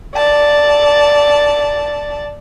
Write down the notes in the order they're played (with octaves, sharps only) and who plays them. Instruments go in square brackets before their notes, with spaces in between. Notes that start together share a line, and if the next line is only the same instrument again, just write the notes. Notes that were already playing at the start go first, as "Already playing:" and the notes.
[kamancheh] D5 A5